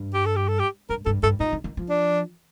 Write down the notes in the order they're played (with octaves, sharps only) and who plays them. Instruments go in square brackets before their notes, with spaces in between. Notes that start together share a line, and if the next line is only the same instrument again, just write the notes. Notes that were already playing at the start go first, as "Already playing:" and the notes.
Already playing: [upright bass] G2
[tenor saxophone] G4
A4
G4
A4
G4
[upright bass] G2 [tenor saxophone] A#4
[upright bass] G2 [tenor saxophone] A4
[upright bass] G2 [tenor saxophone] A4
[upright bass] A#2 [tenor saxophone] D#4
[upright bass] D3
D#3
F3
[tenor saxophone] D4